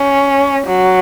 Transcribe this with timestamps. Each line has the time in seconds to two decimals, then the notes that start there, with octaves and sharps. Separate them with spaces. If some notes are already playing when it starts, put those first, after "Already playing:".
Already playing: C#4
0.67 F#3